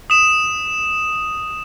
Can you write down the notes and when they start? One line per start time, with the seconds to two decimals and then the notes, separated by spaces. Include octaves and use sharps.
0.10 D#6 E7